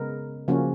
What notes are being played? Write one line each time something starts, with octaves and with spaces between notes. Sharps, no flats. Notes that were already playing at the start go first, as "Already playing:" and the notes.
Already playing: C#3 G#3 B3 A#4
C#3 F3 A#3 C#4 F#4